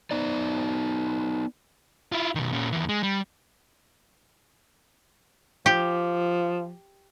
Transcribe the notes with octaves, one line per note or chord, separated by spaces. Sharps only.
B3 D#4 D5
E4 F4
B2 D#3
A#2 C#4
D#2 E3
G#3
G3
F3 G4